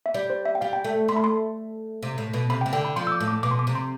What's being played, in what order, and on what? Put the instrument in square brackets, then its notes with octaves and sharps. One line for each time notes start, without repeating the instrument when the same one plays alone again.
[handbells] E5
[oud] G3 [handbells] D5
[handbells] C5
E5
G5
[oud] G3 [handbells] F5
[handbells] G5
[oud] A3
[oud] A3 [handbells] C6
[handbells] B5
C6
[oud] C3
A2
B2
[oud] C3 [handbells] B5
[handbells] G5
[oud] C3
[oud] D3 [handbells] G5
[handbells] B5
[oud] F3 [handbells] C6
[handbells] E6
D6
[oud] A2
[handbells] D6
[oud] B2 [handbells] D6
[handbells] C6
D6
[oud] C3
[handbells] C6